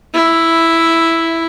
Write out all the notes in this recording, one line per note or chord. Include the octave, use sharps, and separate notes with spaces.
E4